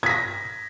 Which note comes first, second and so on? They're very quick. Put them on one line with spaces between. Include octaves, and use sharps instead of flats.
G#6 B6 A#6